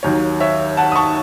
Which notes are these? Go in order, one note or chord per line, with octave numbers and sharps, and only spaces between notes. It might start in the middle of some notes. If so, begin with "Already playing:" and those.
D#2 D#3 F#3 C#5
C#5 E5
F#5 A5
D#6
A5 C#6